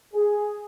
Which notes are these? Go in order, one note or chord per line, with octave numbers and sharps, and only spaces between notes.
G#4